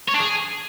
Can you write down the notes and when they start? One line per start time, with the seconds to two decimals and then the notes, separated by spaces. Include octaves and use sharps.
0.09 C#5
0.14 D4
0.20 G#4